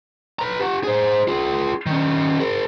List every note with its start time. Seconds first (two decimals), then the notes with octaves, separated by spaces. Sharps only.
0.39 B4 A#5
0.60 G4 F#5
0.83 G#4 C5
1.28 F4 G#4
1.86 D#3 C#4
2.40 G#4 A#4